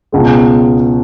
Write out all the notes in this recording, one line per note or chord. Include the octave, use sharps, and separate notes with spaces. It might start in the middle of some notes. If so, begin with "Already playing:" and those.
C#2 B2 G#3